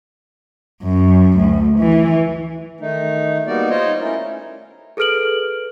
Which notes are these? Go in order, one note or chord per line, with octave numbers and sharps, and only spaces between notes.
F#2
D2
E3
D#3 A3 D#4
G3 A#3 B3 D#4 F#4 D5
D#4 F4 C5 C#5 D#5
A3 C#4 E4 A#4
G#4 A4 B4 F6 D7 F#7